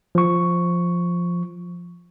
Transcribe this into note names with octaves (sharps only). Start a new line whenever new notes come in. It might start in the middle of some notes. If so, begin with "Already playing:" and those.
F3 C#6